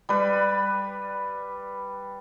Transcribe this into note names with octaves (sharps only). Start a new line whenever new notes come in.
G3 B4